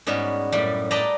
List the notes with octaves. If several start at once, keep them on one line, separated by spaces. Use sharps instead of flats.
G#2 G3 B3 C#4 F#4
F#2 A2 G3 D5
B4 D5 D#5 G5 A5 A#5